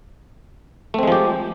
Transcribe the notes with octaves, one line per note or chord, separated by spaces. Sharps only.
F3 G#3 A3 C4 G4